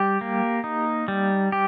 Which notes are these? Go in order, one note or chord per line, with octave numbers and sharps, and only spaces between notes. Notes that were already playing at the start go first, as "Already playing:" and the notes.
Already playing: G3 G4
A#3
D#4
G3
G4